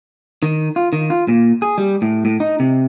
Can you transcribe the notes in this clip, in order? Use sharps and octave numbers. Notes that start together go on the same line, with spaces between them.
D#3
F4
D#3
F4
A#2
G#4
G3
A2
A2
D#4
C3